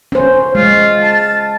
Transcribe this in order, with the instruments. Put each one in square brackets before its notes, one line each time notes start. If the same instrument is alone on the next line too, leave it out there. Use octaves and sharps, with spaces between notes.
[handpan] C#4 C5
[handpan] G#3 [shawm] F4
[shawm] A5